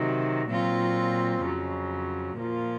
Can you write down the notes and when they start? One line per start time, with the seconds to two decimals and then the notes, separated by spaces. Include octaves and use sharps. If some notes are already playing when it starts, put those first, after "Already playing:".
Already playing: C3 D#3 F#3
0.48 A#2 F#3 C4 F4
1.43 F2 C#3 F#3
2.37 A#2 F3 A#3 F4